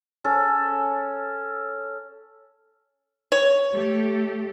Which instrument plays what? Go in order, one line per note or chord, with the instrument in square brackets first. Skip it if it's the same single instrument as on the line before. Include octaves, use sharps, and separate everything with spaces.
[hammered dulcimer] C#4 A4
[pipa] C#5
[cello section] A3 G4 A4